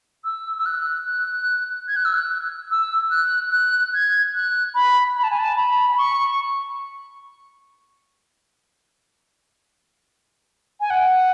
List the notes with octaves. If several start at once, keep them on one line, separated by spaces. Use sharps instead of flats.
E6
E6
F#6
F#6
G#6
F#6
E6
F#6
E6
F#6
F#6
G#6
F#6
B5
B5
A5
G#5
A5
B5
B5
C#6
G#5
F#5